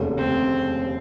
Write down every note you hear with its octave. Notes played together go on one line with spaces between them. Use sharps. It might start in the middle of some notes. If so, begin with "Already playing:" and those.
Already playing: F1 D#2 C#3 A3
C4